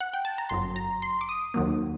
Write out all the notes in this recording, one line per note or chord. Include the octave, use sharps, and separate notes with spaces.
F#5
G5
A5
A#5
G1 F#2 F#3 C6
A#5
C6
D6
D#6
D#2 D#3 F#3 A#3